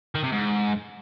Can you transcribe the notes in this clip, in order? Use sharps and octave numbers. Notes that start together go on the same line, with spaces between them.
D#3
C3
G#2